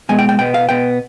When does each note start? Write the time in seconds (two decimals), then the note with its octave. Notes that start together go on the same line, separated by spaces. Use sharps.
0.09 B2 G#3 B3 G#5
0.19 G5
0.29 G5
0.39 B2 B3 G5
0.54 F5
0.69 B2 B3 G5